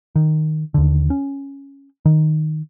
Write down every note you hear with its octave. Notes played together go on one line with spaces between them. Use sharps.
D#3
D#2 D3
C#4
D#3